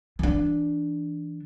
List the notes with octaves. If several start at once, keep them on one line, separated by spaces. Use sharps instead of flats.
E3 D4